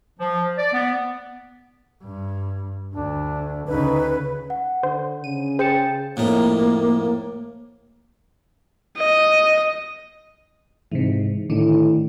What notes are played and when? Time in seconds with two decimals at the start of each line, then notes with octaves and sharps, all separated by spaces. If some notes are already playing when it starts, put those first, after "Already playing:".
0.20 F3
0.58 D5
0.73 B3
2.03 G2
2.94 D2 D4
3.67 D2 C#3 D#4 B4
4.50 F#5
4.83 D3 C5
5.24 C#3 D#7
5.59 G#4 C5 G5 A5 G6 C#7
6.17 F2 A2 A#3 D#4
8.98 D#5
10.92 G#2 C3 E3
11.50 A2 D3 D#3 D4